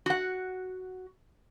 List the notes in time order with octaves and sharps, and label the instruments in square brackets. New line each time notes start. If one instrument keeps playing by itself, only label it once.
[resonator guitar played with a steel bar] F#4 F#5